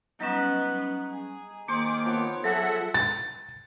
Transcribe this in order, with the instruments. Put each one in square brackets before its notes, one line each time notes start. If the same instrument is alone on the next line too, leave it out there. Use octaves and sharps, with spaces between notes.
[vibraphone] F#3 G3 C#4 [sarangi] B3 [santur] D#4
[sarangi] G#4
[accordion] D#3 D6 [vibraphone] A#3 [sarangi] G#4 [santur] C5
[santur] F3 B3 [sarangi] C#5
[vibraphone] F#3 [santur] G#4 A5 [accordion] A4 E5 F#5
[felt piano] A6